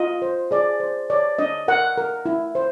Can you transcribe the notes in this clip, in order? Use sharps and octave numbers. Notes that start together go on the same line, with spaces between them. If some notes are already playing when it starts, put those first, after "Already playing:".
Already playing: F4 D#5
C5
G#4 D5
C5
C#5 D5
D4 D#5
A#4 F#5
A#4
E4
C5